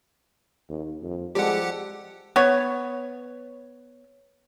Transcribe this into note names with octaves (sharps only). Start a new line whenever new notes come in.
D#2
F2
F3 G3 G#3 G4 A4 F#5
B3 C#5